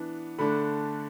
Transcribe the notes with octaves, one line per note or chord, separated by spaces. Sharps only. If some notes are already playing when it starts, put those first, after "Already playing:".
Already playing: E3 B3 D4
D3 A3 D4 B5